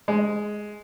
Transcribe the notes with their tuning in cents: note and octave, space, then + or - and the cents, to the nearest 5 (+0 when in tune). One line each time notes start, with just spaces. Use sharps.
G#3 +5